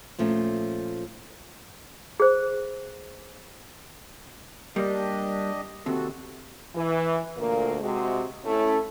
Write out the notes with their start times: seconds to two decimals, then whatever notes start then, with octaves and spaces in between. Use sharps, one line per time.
0.18 A#2 F3 A3 C#4
2.20 G#4 C5
4.76 G3 A#3 D4 G4 D#5
5.86 D#2 C3 F#4 A4
6.75 E3
7.37 D2 A#2 A#3
7.81 C3 G#3 F#4
8.45 A3 C#4 E4